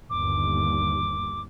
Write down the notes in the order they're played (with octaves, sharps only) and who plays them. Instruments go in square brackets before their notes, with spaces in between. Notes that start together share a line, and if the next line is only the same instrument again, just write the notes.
[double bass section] G1 D#2 [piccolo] D6